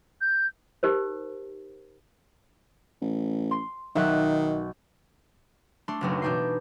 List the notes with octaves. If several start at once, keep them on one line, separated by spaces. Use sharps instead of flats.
G6
D#4 G4 A#4 C5
A1
C6
B1 D#3 E5 F#6
A3 D4 C6
F#1 B1 F#2
B2 E3 D4 D#4 G6 C7